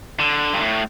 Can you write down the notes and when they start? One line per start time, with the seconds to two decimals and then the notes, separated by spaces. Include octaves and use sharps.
0.20 D3
0.54 G2
0.60 A2